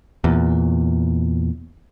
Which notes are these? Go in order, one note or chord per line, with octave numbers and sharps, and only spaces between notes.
E2 A#2